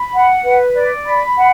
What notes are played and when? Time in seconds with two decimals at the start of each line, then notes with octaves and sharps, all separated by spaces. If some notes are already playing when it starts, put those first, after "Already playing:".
Already playing: B5
0.13 F#5
0.43 B4
0.75 D5
1.05 B5
1.37 F#5